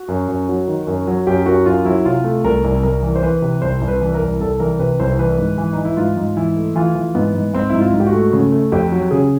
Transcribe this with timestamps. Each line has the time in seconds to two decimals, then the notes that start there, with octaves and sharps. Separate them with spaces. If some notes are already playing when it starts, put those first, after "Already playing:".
Already playing: F#4
0.08 F#2
0.28 F#2
0.48 F#3
0.68 D#3
0.87 F#2
1.07 F#3
1.27 F#2 G4
1.46 F#2 F#4
1.66 F#2 F4
1.85 F#3 E4
2.05 C3 F4
2.24 A3
2.44 C2 A#4
2.64 C2
2.83 C2 A#4
3.03 E3
3.16 C5
3.23 E3 B4
3.42 C3
3.62 C2 C5
3.81 C2
3.88 B4
4.01 E3
4.14 A#4
4.21 C2
4.40 C2 A4
4.60 E3 A#4
4.79 C3 B4
4.99 C2 C5
5.11 C5
5.18 E3 B4
5.38 G#2
5.58 E3
5.73 E3 D#4
5.85 E4
5.97 G#2 F4
6.17 G#2
6.37 E3 E4
6.57 A3
6.76 E3 F4
6.95 E3
7.15 G#2 B3
7.35 G#2
7.54 G#2 C4
7.69 G#2 E4
7.81 F4
7.93 G#2
8.00 G4
8.07 F#4
8.13 A3
8.33 C#3
8.52 A3
8.72 F2 G4
8.92 F#3
9.11 C#3 G#4